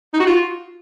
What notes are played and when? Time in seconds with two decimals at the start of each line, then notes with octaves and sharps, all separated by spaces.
0.13 D#4
0.20 F#4
0.26 F4